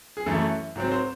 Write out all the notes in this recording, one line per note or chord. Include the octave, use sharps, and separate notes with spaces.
G#4
F#2 E3 A3 A4
G#2 F#3 C4
C5